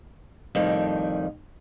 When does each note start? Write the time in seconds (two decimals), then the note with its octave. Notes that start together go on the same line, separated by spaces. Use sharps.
0.55 F2 A2 D#3 G3